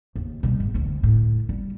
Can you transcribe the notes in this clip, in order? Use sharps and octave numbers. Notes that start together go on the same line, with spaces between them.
D#2
B2 G3
G#2
F1 D2
A2
G3